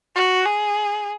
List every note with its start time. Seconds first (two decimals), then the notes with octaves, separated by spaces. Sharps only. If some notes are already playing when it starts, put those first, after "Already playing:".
0.16 F#4
0.46 G#4